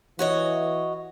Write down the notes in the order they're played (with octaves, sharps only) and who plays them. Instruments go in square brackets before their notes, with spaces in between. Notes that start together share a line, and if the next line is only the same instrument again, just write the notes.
[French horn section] E3 [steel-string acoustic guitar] F#4 C#5 D#5